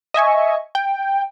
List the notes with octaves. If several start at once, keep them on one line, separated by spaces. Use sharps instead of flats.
D#5 E5 G#5 C#6
G5